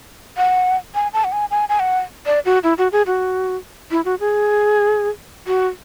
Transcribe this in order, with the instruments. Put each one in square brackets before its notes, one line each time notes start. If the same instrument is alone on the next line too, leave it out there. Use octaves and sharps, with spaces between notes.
[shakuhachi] F#5
G#5
A5
F#5
G#5
G#5
G#5
F#5
D5
F#4
E4
F#4
G#4
F#4
E4
F#4
G#4
F#4